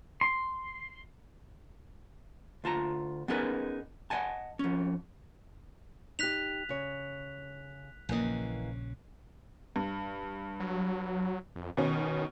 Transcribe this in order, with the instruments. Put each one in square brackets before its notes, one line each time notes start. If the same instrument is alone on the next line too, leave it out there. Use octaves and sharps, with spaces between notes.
[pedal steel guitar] C6
[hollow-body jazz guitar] D2 F4 A5 A#5
B3 C#4 D#4 G#4 A#4 B4
D#5 F#5 G#5 A5
F2 C#4
[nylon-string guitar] D#4 G4 [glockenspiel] F#6 B6 F7
[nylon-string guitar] C#3 C#5
[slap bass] A#1 C#3 [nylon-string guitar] E3 A#3 D#5
[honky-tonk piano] G2
[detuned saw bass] F#3
F2
[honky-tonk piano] B2 C#4 [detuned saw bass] D#3